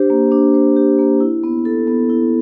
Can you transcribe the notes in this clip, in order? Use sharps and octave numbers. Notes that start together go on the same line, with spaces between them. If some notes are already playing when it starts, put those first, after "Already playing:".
Already playing: D4 G4 C5
A#3
D4
C5
G4
A#3
E4
B3
A4
B3
E4